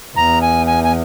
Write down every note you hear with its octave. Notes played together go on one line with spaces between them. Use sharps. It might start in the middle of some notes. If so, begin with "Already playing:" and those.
E2 A#5
G#5
G#5
G#5